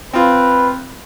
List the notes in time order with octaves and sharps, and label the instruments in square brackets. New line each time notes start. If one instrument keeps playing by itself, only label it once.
[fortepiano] C4 F4 [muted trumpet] B4